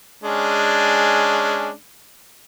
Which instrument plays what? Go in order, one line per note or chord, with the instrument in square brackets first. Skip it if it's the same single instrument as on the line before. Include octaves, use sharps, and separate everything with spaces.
[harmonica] G#3 C#4 D4